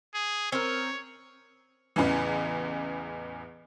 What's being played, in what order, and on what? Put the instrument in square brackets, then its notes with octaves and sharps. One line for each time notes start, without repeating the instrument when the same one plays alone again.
[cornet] G#4
[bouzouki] C4 A#4 [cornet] C#5
[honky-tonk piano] A1 E2 C#3 E3